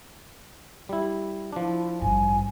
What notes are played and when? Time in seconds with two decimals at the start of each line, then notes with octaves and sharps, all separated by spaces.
0.89 G3 E4
1.52 F3 D4 E4
2.01 A1 G2 G#5